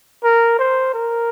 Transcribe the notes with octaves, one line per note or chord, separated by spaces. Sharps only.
A#4
C5
A#4